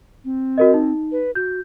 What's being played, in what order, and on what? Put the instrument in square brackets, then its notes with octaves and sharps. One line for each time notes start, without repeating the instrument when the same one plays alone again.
[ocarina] C4
[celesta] F#4 A#4 D#5
D#4
[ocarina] B4
[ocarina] F#4 [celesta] G6